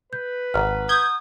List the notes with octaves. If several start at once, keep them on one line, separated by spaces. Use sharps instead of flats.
B4 G6
G#1 F#5 A#5 F6
D#6 G6 G#6